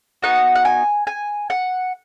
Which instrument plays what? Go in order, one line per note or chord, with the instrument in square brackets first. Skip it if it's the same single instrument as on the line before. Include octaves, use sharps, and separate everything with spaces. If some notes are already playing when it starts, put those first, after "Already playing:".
[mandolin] B3 D#4 F#4 F#5
F#5
G#5
G#5
F#5